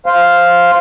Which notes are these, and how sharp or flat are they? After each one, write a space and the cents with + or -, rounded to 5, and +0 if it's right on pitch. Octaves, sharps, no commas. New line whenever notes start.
C5 +0 F5 +0